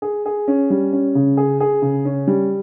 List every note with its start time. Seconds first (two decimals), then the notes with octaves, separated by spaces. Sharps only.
0.02 G#4
0.26 G#4
0.48 C#4
0.70 G3
0.93 C#4
1.15 C#3
1.37 G#4
1.60 G#4
1.82 C#3
2.05 C#4
2.27 G3